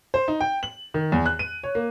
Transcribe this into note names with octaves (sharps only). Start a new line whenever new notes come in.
C5
D#4
G5
F#7
D#3
E2
F#6
D#7
C#5
A#3